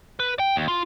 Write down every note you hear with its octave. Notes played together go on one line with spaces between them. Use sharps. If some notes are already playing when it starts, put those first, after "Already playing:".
B4
G5
D#2
F4